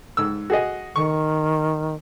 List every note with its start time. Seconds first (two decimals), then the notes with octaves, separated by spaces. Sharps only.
0.17 G#2 E6
0.50 F#4 G#4 D#5
0.96 D#3 C#6